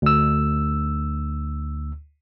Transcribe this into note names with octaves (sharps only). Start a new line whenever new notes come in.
D2 E6